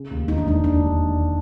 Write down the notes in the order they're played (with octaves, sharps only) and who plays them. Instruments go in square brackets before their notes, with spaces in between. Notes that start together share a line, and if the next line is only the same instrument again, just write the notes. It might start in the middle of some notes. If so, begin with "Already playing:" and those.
Already playing: [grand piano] C#3
D#2
[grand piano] E1 [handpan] D#4
[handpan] D4
[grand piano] E1 [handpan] D#4
[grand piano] D#2 [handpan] D4
[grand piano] E1
E1